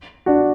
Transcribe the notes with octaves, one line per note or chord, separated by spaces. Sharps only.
D4 F#4